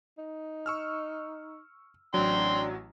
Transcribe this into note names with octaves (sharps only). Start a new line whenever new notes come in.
D#4
C#6 E6 F6
A1 F#3 D4 G5 C6